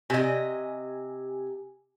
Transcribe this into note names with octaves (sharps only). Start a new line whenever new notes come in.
C3 G4 D#5 G#5